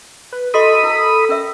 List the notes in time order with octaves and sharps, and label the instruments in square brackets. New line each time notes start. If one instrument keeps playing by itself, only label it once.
[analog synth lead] B4
[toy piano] F#4 D#5 C6 [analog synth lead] A4 [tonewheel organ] B5 D#6
[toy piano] E4 A#4
C#4 A#4 E5